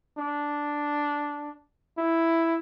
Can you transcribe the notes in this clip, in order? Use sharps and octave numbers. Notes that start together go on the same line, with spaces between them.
D4
E4